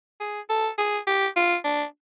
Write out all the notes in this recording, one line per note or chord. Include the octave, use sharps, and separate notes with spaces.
G#4
A4
G#4
G4
F4
D4